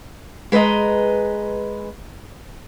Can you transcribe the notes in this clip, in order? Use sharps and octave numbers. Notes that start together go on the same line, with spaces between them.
G#3 B4 C5 D#5 A#5